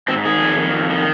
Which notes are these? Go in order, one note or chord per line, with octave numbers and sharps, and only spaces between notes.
G#2 C4
D#3 G#4
F2
D#3
F2
D#3